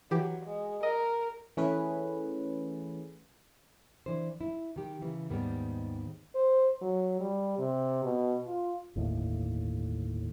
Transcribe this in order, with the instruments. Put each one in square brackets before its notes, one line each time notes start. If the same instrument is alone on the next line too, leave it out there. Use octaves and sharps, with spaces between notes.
[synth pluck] E3 G4 [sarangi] F#3
[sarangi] G#3
[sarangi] A#4 [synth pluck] D#5
[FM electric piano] E3 A3 C#4 G#4 B4
[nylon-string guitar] E3 D4 C5
E4
D#3 G4
C#3 E3
D#2 G#2 D#3 G3 B3
[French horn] C5
F#3
G3
C3
B2
F4
[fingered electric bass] G1 D#2 A2